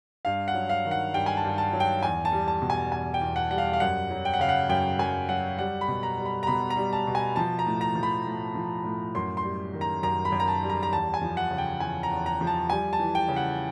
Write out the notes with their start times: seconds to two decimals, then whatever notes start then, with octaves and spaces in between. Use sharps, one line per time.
0.25 G2 F5
0.48 F#5
0.54 F#3
0.69 F5
0.85 D#3
0.91 F#5
1.14 G2 G5
1.26 G#5
1.37 A5
1.44 G2
1.58 A5
1.73 F#3
1.80 G5
2.03 E2 G#5
2.25 A5
2.32 G3
2.48 A5
2.62 B2
2.70 G#5
2.92 E2 G#5
3.14 G5
3.21 E2
3.36 F#5
3.51 G3 F#5
3.58 F5
3.73 F5
3.80 F#2 F#5
4.11 F#3
4.25 G5
4.34 F#5
4.40 C#3 F5
4.49 F#5
4.69 F#2 G5
4.99 F#2 G#5
5.29 F#3 F#5
5.58 G3 F#5
5.81 B5
5.88 B2
6.03 A#5
6.18 G3
6.26 B5
6.43 A#5
6.47 B2 B5
6.70 A#5
6.77 G3
6.93 A5
7.07 B2
7.15 G#5
7.36 F3 A5
7.59 A#5
7.66 A2
7.81 A#5
7.95 F3
8.03 B5
8.26 A2
8.55 F3
8.84 A2
9.15 F#2 C6
9.37 C6
9.43 G3
9.73 D#3
9.81 A#5
10.03 F#2 A#5
10.25 B5
10.32 F#2
10.40 A#5
10.48 A5
10.63 G3
10.69 A#5
10.83 A#5
10.93 E2 A5
11.14 G#5
11.22 F3
11.37 F#5
11.51 C#3
11.58 G5
11.80 E2 G#5
12.03 A#5
12.11 E2
12.26 A#5
12.41 F3
12.47 A5
12.70 G3 G#5
12.93 A5
13.00 E3
13.15 G5
13.29 C#3
13.36 F#5